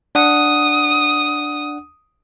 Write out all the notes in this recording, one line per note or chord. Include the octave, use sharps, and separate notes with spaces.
D4 F#5 D#6